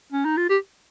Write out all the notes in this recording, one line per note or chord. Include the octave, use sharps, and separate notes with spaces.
C#4
D#4
F4
G4